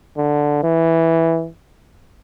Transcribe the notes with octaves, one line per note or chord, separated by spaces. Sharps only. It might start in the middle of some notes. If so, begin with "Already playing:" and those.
D3
E3